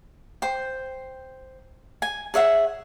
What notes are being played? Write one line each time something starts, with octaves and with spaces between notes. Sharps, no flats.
C5 G5
G#5
G#4 C#5 E5 F#5